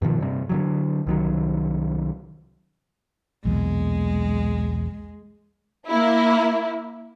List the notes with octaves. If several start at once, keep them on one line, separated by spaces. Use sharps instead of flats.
G2 B2 D#3 F3
G2 C3
D3 D#3 F#3
C2 D#3 F#3
B1 E2 A#2 G#3
A#3 E4